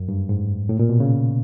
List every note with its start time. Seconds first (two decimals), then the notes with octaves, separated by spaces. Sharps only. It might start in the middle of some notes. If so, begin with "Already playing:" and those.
Already playing: F#2
0.09 G2
0.29 G#2
0.69 A2
0.79 A#2
0.89 B2
1.00 C#3